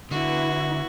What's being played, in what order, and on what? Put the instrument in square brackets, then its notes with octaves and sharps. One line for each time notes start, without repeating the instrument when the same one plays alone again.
[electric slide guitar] D3 [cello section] B3 E4 [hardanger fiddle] F#4